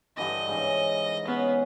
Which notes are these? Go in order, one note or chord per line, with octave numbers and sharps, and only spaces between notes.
G2 D3 E3 D#5
G#2 C#3 E3
B3 C#4 G#4